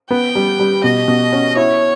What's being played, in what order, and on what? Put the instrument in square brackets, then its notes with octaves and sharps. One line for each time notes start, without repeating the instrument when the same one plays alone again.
[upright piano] B3 [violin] G5
[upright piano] G3
G3
[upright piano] B2 [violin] D#5
[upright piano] B2
C#4
[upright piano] E4 [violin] C#5